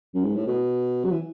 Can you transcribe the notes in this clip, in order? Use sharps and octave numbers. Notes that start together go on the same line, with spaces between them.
F#2
G#2
A2
B2
F#3
E3